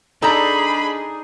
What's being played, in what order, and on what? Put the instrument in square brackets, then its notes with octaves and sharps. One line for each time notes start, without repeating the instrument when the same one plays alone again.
[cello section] D4 G#4 [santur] D#4 [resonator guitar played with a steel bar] A4 D5 A#5 [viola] B5